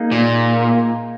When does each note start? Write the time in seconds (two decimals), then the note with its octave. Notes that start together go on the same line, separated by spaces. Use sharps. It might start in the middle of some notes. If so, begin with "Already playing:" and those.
Already playing: A#3 D#4 G#4
0.12 A#2